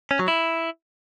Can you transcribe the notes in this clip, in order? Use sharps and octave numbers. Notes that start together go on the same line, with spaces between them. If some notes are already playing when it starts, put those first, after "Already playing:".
C#4
F#3
E4